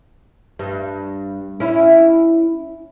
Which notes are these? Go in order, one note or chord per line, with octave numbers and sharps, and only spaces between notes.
G2
C#4 E4